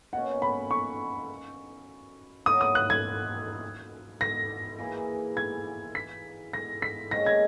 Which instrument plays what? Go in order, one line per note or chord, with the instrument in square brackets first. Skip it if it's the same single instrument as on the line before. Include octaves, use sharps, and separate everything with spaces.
[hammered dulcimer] B2 A#3 C#4 [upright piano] F#5
[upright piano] B5
C#6
[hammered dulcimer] F#3 A#3 E4 A#4 [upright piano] D#6
[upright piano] D#6
F#6
G#6
A#6
[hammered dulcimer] E3 A#3 E4 G#4
[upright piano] G#6
B6
A#6
B6
[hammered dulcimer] G#2 D#3 A#3 C#4 [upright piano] A#6
[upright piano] G#6